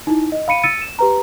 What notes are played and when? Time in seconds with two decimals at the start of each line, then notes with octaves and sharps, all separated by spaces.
0.07 D#4 E4
0.32 D#5
0.48 F5 B5 C#7 D#7
0.64 E6 A6 C#7 D#7
0.82 E7
0.99 G4 B4 A#5